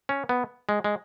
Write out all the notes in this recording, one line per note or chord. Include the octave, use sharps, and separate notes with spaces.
C#4
B3
G#3
G#3